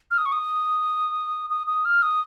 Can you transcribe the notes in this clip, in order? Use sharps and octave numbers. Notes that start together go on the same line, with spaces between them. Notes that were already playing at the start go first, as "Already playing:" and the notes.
F6
D#6
C#6
D#6
D#6
D#6
F6
D#6